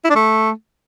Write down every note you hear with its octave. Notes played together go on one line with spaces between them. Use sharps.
E4
D4
A3